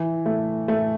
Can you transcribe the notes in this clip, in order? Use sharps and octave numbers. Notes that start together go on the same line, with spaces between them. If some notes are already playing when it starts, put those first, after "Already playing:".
Already playing: E3
A3
A3